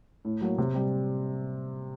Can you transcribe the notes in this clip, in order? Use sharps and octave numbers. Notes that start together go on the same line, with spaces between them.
A2
F#3 A#3
C3
G3 C4